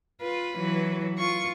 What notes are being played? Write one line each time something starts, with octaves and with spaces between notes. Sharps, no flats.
F4 B4
E3 F#3
F4 C#6